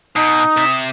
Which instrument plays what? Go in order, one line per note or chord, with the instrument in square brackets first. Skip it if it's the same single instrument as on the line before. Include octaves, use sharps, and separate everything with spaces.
[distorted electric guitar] B2 [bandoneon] D#4 [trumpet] D#6
[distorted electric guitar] C3 E5